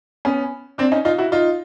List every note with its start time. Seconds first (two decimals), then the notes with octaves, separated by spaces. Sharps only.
0.25 B3 C#4
0.78 C4 D4
0.92 C#4 D#4
1.05 D#4 F4
1.18 E4 F#4
1.32 D#4 F4